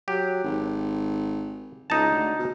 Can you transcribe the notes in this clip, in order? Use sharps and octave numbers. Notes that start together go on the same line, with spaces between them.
F#3 G4
G#1
C#2 D#4 A5
D2
B2